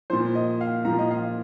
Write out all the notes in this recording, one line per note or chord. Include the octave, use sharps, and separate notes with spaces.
A#2 F3 C5
D#5
F5
A#2 F3 A#5
D#5
F5